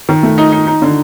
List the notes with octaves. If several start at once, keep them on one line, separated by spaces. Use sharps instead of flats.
D#3
A3
D#4
D#4
D#4
D3